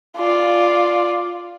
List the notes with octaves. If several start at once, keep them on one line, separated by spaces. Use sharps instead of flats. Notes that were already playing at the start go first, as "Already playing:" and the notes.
F4 D5